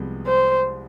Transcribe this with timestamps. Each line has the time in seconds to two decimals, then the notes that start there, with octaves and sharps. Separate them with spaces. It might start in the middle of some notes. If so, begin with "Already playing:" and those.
Already playing: C2 C3 F3 G#3 B3
0.27 C5